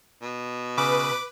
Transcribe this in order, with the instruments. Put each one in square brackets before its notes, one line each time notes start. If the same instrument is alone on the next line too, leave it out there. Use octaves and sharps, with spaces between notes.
[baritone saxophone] B2
[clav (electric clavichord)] C#3 [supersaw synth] B4 [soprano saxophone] D6